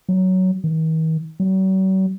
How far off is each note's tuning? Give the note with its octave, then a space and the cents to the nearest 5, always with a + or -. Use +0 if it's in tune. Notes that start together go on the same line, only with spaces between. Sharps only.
F#3 +10
D#3 +45
F#3 +45